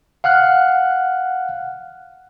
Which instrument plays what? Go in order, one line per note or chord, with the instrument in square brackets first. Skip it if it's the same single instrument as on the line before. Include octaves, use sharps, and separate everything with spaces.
[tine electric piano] F5 F#5 F6 F#6